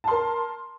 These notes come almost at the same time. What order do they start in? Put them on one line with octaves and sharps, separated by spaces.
A5 C6 A#4